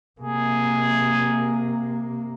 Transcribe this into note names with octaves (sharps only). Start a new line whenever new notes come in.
C3 A#3 G#4